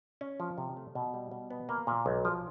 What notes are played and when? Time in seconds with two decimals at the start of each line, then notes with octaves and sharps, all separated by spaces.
0.21 C#4
0.40 F3
0.58 C3
0.77 A3
0.95 B2
1.14 G3
1.31 B2
1.50 B3
1.69 A#3
1.87 A#2
2.06 B1
2.25 F3